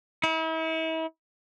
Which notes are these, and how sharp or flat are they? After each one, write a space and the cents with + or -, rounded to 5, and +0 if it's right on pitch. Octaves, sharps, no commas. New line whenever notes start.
E4 -40